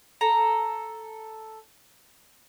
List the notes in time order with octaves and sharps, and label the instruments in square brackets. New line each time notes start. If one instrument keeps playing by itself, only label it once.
[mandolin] A4 A#5